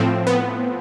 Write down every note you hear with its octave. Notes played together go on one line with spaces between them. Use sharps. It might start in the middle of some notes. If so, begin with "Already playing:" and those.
Already playing: A2 F3 C4
B3